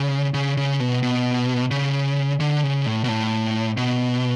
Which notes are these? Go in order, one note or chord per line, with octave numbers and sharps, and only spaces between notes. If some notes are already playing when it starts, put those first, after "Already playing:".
Already playing: C#3
C#3
C#3
B2
B2
C#3
D3
C#3
A2
B2
A2
B2